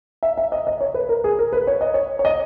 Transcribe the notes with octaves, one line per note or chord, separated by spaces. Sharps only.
E5
E5
D#5
D#5
C#5
B4
A#4
G#4
A#4
B4
C#5
D#5
C#5
C#5
D#5